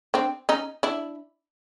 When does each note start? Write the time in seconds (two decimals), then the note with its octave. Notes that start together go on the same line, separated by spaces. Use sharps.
0.14 C4 D4
0.49 C#4 D#4
0.83 D4 E4